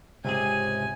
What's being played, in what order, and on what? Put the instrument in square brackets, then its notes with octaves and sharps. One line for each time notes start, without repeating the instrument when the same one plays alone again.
[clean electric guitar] C#2 G#2 G#4 [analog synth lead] C3 [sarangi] G#5